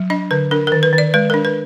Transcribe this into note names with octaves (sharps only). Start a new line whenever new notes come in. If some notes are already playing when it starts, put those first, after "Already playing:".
Already playing: F#3
D4 D#5
D3 B4
D4 A#4
D#3 A#4
B4
D#3
D5
G#3 B4
D4 A#4
B4